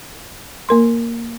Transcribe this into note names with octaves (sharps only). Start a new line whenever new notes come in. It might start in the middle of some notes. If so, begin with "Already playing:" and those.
A#3 A#4 C6